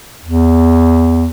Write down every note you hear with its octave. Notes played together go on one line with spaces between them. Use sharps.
E2